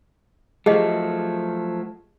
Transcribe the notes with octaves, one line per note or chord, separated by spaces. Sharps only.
F3 F#3 A3 G4 G#4 D#5